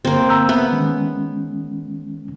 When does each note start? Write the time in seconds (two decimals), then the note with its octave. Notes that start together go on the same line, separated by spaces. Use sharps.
0.05 G2 D3 A#3 C4
0.29 A#5 E6 G6
0.49 B3 E5
0.72 D#3 G#3 C#4